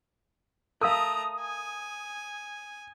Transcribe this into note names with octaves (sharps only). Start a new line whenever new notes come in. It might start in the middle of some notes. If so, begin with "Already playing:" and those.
A3 A#4 F5 A#5 D#6
G#5